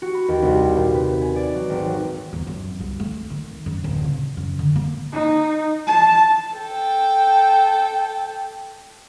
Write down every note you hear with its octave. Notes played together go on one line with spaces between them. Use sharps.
F#4
B5
D#2
C2
C4
A#2
B4
G#5
D5
F#3
G#1
F#3
E2
F#2
C2
A3
D#3
F#2
D1
C#3
F#2
D3
A#3
D#4
A5
A4 G5